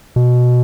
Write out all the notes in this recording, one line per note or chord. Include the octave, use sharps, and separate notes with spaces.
B2